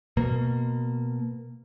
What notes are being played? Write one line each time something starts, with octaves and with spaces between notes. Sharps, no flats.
B2 A#3